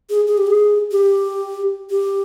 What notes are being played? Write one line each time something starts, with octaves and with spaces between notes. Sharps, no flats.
G#4
G#4
G4
G#4
G4
G4